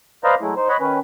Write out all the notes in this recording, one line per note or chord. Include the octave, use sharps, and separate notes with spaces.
B4 C5 D5 D#5 F5 A#5
F#3 G#3 A3 E4
D#4 C5
C#5 D#5 F#5 B5
D#3 C#4 B4